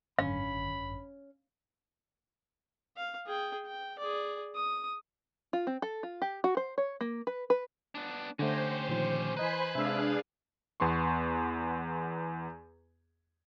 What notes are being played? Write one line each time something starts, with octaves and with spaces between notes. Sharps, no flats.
G#1 F#2 D3 C#4 F5 B5
F5
G#4 G5
G5
G#4 D5
D#6
F4
C4
A4
F4
G4
F#4
C5
C#5
A#3
B4
B4
B3 D4
D3 A3 C#4 G4 C5 F#5 G#6 A#6
A#2 D#3 F3
E3 B4 C5 D#5 G#5 A#5 B5
C3 G#3 D4 G#4 E5 F5 E6
E2 B3 C6 C#6